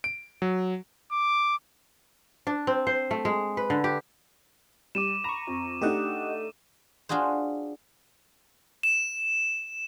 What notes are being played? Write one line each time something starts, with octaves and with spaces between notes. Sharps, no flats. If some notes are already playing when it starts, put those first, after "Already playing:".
D7
F#3
D6
D4
C4
C5
A3
G#3
B4
D3
G4
G3 D6 D#7 E7
A#5 B5 C#6
F2
A3 D4 D#4 G4 D#5 F#5
D4 F4 F#4 G#4 C5
E7